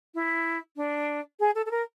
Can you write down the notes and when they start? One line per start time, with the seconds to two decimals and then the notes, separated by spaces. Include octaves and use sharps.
0.15 E4
0.76 D4
1.40 G#4
1.55 A4
1.66 A4
1.71 A#4